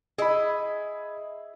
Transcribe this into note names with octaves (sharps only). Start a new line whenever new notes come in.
E4 G#4 D#5 B5